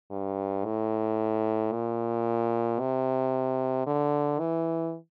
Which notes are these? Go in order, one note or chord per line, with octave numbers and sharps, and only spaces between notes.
G2
A2
A#2
C3
D3
E3